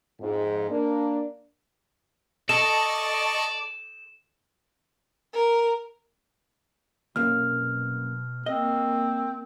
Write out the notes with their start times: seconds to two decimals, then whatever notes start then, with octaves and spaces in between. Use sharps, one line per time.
0.20 F2 G#2
0.70 A#3 D4
2.49 A4 D5 D#5 A5 C#6 E7
5.34 A#4
7.16 C2 F#2 B2 A#3 F6
8.46 A#3 C4 D#5